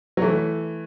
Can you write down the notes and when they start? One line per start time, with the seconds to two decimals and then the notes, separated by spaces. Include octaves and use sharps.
0.17 F#3
0.22 E3 A3